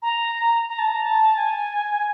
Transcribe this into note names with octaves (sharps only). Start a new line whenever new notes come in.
A#5
A#5
A5
A#5
A5
G#5